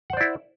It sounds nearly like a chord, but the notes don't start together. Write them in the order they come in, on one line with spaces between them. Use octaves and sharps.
F#5 C5 D5 E4